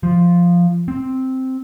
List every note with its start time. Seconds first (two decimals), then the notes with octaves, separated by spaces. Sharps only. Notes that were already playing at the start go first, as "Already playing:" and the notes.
0.03 F3
0.88 C4